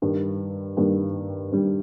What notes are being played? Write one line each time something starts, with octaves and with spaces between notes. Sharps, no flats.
G2 D#3 G3
G2 D#3 G3
G2 D#3 G3